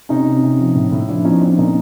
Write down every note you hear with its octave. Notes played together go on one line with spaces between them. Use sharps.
C3 C#4 D#4
C3
C3
F3
A2
A2
F3 D4 E4
F3 C#4 D#4
F3 C4 D4
A#2 C#4 D#4